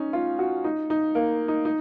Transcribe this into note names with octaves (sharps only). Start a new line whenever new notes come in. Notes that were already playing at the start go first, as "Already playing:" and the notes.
Already playing: C#4 D#4
F4
F#4
D#4
D#4
A#3
D#4
D#4